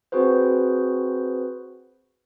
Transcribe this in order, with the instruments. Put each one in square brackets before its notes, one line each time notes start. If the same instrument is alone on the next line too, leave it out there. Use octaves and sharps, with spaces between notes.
[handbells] C4 F#4 G#4 B4 C5